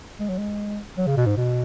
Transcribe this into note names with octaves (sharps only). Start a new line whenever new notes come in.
G#3
F#3
G#3
F#3
C#3
B2
G#2
B2